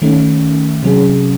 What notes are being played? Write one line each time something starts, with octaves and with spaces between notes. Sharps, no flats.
D#3 A3 C#4
C3 F#3 C#4 G#4